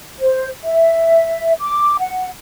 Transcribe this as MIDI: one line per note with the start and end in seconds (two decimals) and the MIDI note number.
0.19 0.48 72
0.64 1.53 76
1.61 1.96 86
1.99 2.28 78